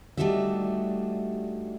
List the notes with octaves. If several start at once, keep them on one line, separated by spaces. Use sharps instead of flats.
G3 A3 D4 D#4 F#4 E5